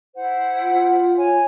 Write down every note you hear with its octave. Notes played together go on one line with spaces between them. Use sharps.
E4 C5 F#5
F4
C#5 G#5